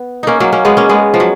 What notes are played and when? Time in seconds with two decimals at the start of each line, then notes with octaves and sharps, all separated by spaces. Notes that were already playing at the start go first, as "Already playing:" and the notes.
Already playing: B3
0.23 A#3 C#4 D#4
0.40 F#3 A#3
0.52 A#3 C#4
0.65 G#3 B3
0.77 A#3 C#4
0.89 G#3 B3
1.14 F3
1.20 F#3